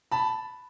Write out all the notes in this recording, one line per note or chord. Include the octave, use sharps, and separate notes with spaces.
A5 B5